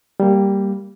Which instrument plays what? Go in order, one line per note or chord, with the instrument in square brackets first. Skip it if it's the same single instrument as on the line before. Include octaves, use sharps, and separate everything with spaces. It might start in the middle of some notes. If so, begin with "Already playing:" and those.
[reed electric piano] G3 A#3